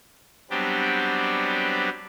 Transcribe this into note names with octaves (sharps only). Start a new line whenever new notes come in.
F#3 G3 B3 C4 D4 G4